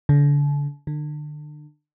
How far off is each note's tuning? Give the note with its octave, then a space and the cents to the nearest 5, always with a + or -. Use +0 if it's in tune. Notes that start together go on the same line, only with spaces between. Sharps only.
D3 -35
D3 +35